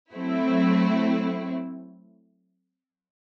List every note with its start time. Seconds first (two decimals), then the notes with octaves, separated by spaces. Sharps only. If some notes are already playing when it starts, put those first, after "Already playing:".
0.13 F#3 A3 C4 E4